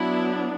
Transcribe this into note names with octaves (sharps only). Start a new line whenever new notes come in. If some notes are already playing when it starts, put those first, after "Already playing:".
Already playing: F#3 B3 D4 E4